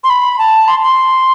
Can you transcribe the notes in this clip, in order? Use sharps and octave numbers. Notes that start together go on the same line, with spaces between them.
C6
B5
A5
C6
C6